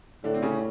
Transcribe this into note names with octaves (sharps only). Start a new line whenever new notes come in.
A2 D3 D4
C4
C#3 C#4